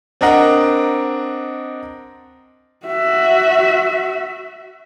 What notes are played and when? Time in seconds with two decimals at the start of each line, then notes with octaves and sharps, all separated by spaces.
0.21 C4 D4 A#4 D#5 F#5 A#5
2.86 F#4 E5